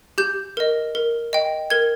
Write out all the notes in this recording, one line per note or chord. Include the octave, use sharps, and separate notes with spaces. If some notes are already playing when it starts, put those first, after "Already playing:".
G4 G6
A#4 D#5
A#4
D#5 G5
A#4 G#6